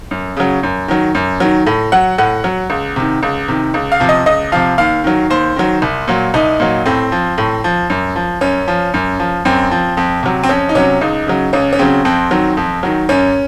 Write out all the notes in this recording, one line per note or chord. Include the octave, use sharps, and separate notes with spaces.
F#2
C#3 F#3
F#2
D#3 F#3
F#2
D#3 F#3
A2
F#3 F#5
A2 F#5
F#3
C#2
C3 D#3
C#2
C3 D#3
C#2
F5
C3 F3
D#5
C#2 D#5
C3 F3 F5
D#2 F5
D#3 F#3
D#2 C5
D#3 F#3
C2
A#2 F#3
C2 D#4
A#2 F#3
A2 C4
F3
A2
F3
F#2
F3
F#2 C#4
F3
F#2
F3
F#2 C4
F3
F2
C3 F#3
C4
F2 C#4
D#4
C3 F#3 C#4
C#2 D#4
C#3 F#3
C#2 C#4
C#4
C#3 F#3 C4
F2 C4
D#3 F#3
F2
D#3 F#3
F#2 C#4